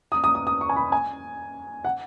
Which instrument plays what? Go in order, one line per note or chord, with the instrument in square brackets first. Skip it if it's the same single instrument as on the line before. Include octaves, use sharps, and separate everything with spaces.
[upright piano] D#6
D#6
D#6
D#6
C#6
G#5
B5
G#5
F#5